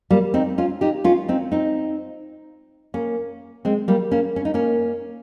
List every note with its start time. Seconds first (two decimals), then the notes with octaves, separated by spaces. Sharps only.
0.10 G3 A#3
0.34 C4 D#4
0.58 C#4 F4
0.81 D#4 G4
1.04 C#4 F4
1.29 C4 D#4
1.52 C4 D#4
2.94 A#3 C#4
3.65 G#3 C4
3.88 G3 A#3
4.11 A#3 C#4
4.36 C#4
4.45 D#4
4.54 A#3 C#4